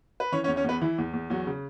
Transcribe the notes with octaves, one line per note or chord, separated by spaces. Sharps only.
B4
E3 C#4 C#5
C#4 C#5
E2
C#4 C#5
E2 B3 B4
E3 E4
E2
E2
E2 F#3 F#4
C#3